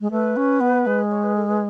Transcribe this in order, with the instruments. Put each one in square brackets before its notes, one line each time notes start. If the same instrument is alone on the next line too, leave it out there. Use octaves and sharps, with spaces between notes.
[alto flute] G#3
[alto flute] A3 [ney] B4
[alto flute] C#4
B3
G#3
[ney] C#5
B4
A4
B4